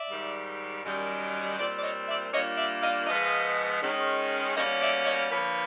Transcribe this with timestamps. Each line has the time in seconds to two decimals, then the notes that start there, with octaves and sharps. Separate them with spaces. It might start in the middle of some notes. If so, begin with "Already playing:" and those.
Already playing: D5 E5
0.09 G#2 D#3 G3
0.83 F#2 D#3 G3
1.58 A#2 G3 C4 C5 D5
1.77 D5
1.82 C#5 D#5
2.08 D5 E5
2.33 A#2 G3 A#3 D4 C#5 D#5
2.57 D5 E5
2.82 D#5 F5
3.07 G#2 F3 G#3 B3 D#5 F5
3.82 D#3 G#3 C#4
4.56 B2 G3 A#3 C#4 C#5 D#5
4.81 D5 E5
5.06 C#5 D#5
5.31 D3 F3 A#3 B4 C#5